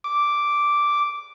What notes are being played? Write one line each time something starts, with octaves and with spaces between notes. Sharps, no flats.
D6